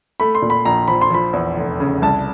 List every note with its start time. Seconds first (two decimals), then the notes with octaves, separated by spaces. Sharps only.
0.20 A3 B5
0.35 C6
0.42 A#2
0.50 B5
0.65 A#1 A#5
0.88 F3 B5
1.02 C6
1.10 F3 B5
1.33 E2
1.57 F1
1.80 C#3
2.02 C2 A5